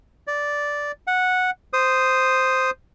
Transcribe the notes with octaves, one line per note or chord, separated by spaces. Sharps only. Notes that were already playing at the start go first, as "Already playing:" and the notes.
D5
F#5
C5 D#6